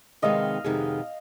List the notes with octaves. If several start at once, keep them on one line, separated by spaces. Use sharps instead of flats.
F2 C3 D#3 G#3 B3 D#5 F5
F2 C3 D#3 G#3 B3